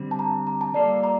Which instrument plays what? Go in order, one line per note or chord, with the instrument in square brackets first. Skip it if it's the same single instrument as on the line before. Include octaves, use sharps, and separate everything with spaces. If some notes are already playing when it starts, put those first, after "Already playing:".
Already playing: [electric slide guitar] D3 G3 C4
[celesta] A5
A#5
A#5
A5
[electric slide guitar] G3 A#3 F4 A4 [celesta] D5
[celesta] A#5